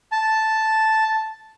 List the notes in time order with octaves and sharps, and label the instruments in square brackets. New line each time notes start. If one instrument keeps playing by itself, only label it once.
[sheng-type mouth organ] A5